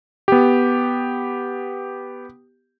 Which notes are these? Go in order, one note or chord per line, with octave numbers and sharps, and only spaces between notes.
B3 G4